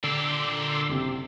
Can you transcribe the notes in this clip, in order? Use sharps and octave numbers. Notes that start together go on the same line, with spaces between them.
A#2 D3 G4 C6 D6 E6
F#1 C3